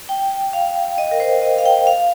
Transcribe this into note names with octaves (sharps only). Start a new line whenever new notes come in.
G5
F5
D#5
A#4
C5
D#5
F5
G5
F5